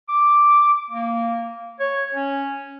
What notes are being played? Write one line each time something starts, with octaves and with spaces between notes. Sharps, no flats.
D6
A#3
C#5
C#4